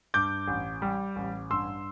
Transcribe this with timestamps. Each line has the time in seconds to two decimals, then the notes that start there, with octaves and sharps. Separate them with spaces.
0.14 G2 D6 G6
0.48 A1
0.82 G3
1.16 A1
1.50 G2 C6 E6